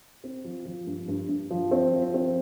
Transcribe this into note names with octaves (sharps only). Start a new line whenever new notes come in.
C4
F3
F3
G2
G2
G2
F3
C4
F3
C4